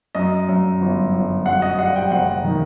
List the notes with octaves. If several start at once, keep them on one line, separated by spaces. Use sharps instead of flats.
F#2 D#5
F#2
G1
G1
F#2 F#5
D#5
G3 F#5
G5
F#1 F#5
D#3